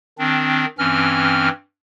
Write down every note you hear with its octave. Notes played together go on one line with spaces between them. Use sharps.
D#3 C4 D4
G2 E3 C4 C#4 F6